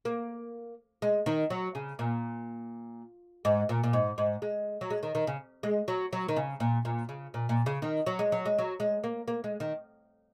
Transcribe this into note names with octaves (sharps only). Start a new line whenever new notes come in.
A#3
G#3
D#3
F#3
C#3
A#2
G#2
A#2
A#2
G#2
G#2
G#3
F#3
G#3
D#3
D#3
C#3
G#3
F#3
F#3
D#3
C#3
A#2
A#2
C#3
A#2
A#2
C#3
D#3
F#3
G#3
F#3
G#3
F#3
G#3
A#3
A#3
G#3
D#3